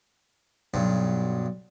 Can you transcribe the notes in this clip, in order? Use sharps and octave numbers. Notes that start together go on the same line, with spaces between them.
B1 G2